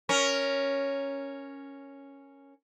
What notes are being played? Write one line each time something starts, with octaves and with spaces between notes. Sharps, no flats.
C#4 A#4